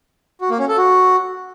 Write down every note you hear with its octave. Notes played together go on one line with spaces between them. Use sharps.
F#4
A#3
C#4
A4
F#4